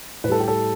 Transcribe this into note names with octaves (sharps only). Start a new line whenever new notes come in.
A2 G3 A4 B4
G4
A4